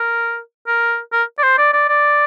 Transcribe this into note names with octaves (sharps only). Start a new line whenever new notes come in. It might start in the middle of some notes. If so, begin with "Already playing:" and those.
Already playing: A#4
A#4
A#4
D5
C5
D5
D5
D5